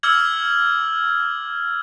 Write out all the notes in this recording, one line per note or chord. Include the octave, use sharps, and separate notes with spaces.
D6 E6 F6 G#6 F#7